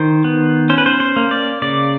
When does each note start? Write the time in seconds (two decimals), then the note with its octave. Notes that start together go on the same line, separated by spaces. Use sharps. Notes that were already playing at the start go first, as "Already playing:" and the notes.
Already playing: D#3 C5
0.25 B3
0.70 C#4 C5
0.78 B4
0.86 C5
1.00 C5
1.16 A#3
1.31 D5
1.62 C#3 D5